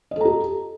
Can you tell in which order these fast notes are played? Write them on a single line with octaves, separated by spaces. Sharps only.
D#5 A4 A#5 G4